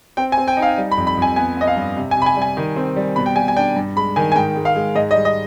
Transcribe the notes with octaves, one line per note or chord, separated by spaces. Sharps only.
C4 G5
G#5
C4
G5
D#4
F5
G3
B5
F2
B5
F2 G#5
B3 G#5
B3 D#5
F5
G2
C3
G#5
C3 B5
G#5
G3
G#5
D#3
C4
G3
B2 B5
G5
G3 G#5
G#5
D4 G5
G2
G#3 B5
D#3 G#5
G#5
G#2 G5
G#3
F5
G#3
G#2 D#5
D#5
G3
D#5